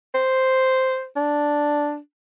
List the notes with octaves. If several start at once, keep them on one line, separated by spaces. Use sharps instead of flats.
C5
D4